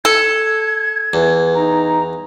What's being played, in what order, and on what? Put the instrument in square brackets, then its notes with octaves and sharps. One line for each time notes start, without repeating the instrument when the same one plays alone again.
[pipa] A4 [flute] G#6
[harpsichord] E2
[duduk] D#4 [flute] A#5